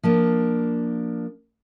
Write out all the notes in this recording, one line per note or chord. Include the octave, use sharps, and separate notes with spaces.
F3 A#3 D4